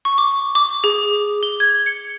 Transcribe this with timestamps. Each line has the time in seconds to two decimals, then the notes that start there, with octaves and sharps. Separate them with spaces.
0.05 C#6
0.18 D6
0.55 D6
0.84 G#4
1.43 G7
1.60 G#6
1.86 C#7